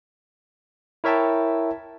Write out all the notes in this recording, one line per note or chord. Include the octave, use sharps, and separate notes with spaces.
E4 A#4 C#5 E5 G5 A5